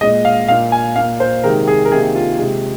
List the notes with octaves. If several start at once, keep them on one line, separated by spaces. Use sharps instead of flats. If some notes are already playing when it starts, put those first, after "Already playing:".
A#2 G#3 D#5
F5
A#2 A#3 F5
G#5
A#2 A#3 F5
C5
C3 D#3 G#3 A#4
G#4
A#4
C3 D#3 A#3 G#4
F4
C3 G#3